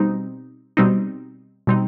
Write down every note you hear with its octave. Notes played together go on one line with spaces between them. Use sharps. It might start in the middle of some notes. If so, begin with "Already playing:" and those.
Already playing: B2 G3 C4 D#4
B2 G3 C4 D#4
B2 G3 C4 D#4